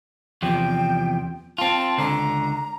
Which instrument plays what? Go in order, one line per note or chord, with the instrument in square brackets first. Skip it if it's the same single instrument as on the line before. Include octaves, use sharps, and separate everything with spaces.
[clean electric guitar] E2 C3 F3 [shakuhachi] G5
[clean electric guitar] C4 F4 [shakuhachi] A5
[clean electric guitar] C#2 D3 [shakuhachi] A#5